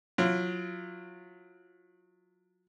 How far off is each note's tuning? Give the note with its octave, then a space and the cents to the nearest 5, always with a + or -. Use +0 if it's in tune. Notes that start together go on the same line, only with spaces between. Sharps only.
F#3 -30 F4 -30